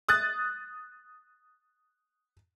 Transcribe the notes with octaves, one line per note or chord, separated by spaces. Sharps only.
D#6 F#6 A6